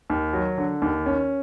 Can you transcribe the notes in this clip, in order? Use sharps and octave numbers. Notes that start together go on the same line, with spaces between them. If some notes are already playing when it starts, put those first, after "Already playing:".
D#2
F#3
D3
D#2
C#4